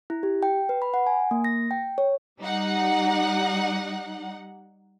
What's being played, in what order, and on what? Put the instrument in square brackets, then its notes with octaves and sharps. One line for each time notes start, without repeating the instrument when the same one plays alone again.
[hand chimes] E4
G4
G5
B4
B5
F#5
G#5
A#3
A#6
G5
C#5
[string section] G3 D#4 F#5